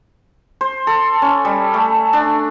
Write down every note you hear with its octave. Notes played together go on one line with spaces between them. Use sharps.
C5
A4
C#4
G3
A3
D4